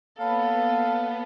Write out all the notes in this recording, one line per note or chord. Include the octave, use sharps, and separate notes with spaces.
A#3 B3 A4 C#5 F5 B5